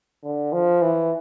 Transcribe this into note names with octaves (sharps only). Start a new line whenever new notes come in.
D3
F3
E3